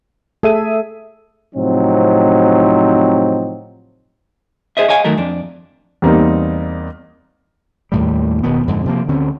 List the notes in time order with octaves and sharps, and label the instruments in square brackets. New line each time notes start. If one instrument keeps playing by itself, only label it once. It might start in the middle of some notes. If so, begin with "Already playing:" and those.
[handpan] A3 A4 [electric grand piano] G#4 E5 D#7
[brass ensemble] A2 C3 F3 F#3 C4 D#4
[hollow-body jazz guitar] G#4 C5 D#5 E5
C#5 D#5 F5 G#5
D#3 F#3 A3 A#4
F2 D4
[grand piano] E2 G3 A#3 C4 D#4
[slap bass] D#2 A2 G3
E1 B2 D#3 B3
F2 G#2 D3
C3 F3 A#3
D2 D3 C4 C#4